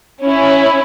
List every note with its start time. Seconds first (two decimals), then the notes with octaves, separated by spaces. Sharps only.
0.22 C#4 E4